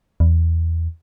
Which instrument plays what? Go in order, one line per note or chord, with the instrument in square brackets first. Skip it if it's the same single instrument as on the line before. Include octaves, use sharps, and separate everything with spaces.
[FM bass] E2